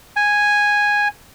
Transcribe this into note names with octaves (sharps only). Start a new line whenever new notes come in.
G#5